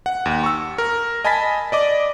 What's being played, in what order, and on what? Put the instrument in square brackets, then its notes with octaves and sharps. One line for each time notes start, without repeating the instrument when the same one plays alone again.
[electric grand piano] F#5
D#2
C#6 E6
A#4
D#5 G#5 A5 B5 A6 B6
D5 D#5 D6